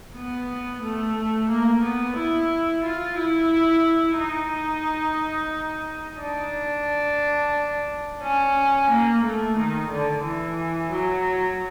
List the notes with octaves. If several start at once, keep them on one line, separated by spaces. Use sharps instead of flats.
B3
A3
A#3
B3
E4
F4
E4
D#4
D4
C#4
A#3
A3
D#3
D3
E3
F#3